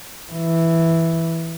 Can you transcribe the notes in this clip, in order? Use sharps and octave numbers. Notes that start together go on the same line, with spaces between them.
E3